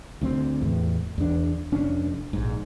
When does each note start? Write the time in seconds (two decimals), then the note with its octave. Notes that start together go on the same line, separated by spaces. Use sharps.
0.22 D2 B3 C4
0.61 E2 A2
1.18 E2 D4
1.72 F1 C#4 D4
2.33 A#1 G#2